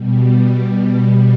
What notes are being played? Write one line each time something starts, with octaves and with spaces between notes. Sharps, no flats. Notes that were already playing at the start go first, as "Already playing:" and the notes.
Already playing: B2 G3